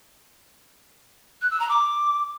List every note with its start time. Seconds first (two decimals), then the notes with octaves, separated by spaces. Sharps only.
1.42 F#6
1.51 E6
1.60 A#5
1.69 D6